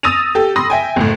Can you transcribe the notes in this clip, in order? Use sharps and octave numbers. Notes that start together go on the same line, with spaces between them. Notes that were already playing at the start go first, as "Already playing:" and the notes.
D#6 E6 A6 A#6 D#7 F7
G4 A4
B5 C6 D#6 A#6
E5 G5 G#5
F#1 A2